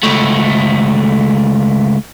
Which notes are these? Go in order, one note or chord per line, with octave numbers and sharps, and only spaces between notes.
C#2 A3